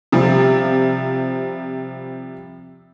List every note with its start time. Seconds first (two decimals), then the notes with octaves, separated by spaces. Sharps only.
0.12 C3 F3 G3